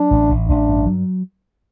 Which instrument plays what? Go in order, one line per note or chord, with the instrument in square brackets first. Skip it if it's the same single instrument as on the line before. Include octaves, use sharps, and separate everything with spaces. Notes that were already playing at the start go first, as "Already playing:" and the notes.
Already playing: [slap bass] F#3 [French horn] D4
[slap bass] A1
A1
[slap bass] A1 [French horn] D4
[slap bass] G2
F#3